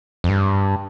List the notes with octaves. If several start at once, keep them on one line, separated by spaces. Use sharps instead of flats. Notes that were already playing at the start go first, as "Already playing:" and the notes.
F2
G2